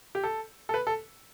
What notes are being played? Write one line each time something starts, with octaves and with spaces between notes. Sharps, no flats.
G4
A4
A4
B4
A4